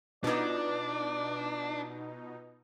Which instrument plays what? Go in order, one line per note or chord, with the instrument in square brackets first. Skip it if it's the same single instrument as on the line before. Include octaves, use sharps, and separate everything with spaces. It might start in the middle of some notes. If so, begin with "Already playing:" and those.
[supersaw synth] B2 D#4 [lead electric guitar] D4 [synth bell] F4 B4 [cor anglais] D5